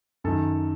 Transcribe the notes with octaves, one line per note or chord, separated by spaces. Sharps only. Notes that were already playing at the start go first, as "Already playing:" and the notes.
F#2 D#3 A4